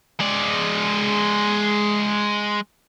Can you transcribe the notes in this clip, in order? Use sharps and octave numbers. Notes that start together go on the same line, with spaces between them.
G#3 D5